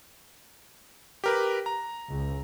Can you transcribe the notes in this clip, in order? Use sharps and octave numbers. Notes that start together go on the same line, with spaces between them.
G4 A#4 B4
A#5
C#2